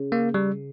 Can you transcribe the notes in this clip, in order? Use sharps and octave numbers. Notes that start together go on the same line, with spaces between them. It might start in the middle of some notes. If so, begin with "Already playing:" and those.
Already playing: C#3
A#3
G3